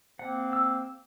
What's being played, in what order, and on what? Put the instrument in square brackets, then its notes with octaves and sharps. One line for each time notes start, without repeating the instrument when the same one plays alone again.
[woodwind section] G#2 A#3 C4 [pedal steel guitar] F#5
[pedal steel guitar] E6